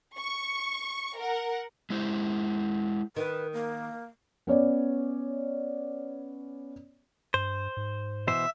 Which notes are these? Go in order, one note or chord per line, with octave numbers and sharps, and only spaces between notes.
C#6
A#4 F#5
G#3 E4 C5
D#3 B4
A#3
B3 C#4 C#5 D5
G2 C5
G#2
B2 E3 C5 E5